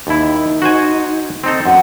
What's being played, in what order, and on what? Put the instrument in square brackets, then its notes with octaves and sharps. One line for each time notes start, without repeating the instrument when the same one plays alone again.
[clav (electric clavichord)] D#2 E4 [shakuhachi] D#4
[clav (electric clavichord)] F#4 C5 G#5
C4 D#4 A4
[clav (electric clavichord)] F#2 [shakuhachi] F#5